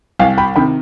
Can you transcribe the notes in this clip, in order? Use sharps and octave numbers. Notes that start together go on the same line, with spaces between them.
C2 F5 G#5
G5 B5
C3 D#3 G5 B5